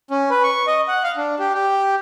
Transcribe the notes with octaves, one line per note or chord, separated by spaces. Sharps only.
C#4
B4
C#6
D#5
F#5
F5
D4
G4
G4